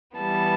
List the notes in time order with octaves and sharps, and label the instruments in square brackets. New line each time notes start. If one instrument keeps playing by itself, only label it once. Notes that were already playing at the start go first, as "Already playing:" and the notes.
[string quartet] E3 G3 B3 A5